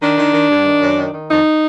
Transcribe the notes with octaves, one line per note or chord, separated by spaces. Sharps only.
D#3 D4
D#3
D#3
G2
D#3
F#2
D#3
D#3
F2 D#4